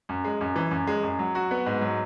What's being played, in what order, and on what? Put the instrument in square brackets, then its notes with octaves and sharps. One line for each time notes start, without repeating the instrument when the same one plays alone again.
[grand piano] F#2
G#3
F#2
E3
F#2
G#3
F#2
F#3
F#4
B3
G#2
F#3